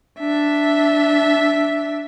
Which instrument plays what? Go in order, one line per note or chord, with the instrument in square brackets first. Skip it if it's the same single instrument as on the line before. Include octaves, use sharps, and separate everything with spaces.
[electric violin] D4 E5